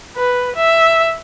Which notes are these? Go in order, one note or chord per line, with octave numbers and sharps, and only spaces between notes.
B4
E5